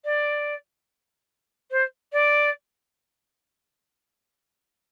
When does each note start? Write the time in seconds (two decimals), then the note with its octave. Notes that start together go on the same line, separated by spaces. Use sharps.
0.04 D5
1.70 C5
2.12 D5